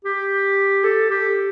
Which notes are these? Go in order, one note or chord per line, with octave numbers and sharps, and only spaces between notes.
G4
A4
G4